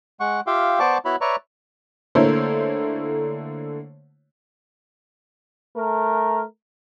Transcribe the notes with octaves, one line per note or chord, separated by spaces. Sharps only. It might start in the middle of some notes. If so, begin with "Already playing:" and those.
G#3 F#5 C#6
F4 G4 E5 F5 G5
B3 C5 D5 A5 C#6 D6
B3 E4 F#4 C#5 B5
B4 C#5 D5 E5 A#5 C#6
D3 A3 A#3 E4 C5 C#5
A3 A#4